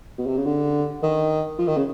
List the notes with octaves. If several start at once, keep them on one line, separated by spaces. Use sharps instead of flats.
B2
C3
C#3
D3
D#3
F3
D#3
C#3